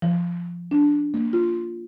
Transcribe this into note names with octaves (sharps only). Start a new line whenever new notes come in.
F3
D4
A#3
F4